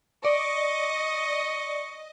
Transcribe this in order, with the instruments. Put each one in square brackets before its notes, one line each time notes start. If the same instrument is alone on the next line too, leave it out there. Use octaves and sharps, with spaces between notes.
[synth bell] D5 [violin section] D#5 [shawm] C#6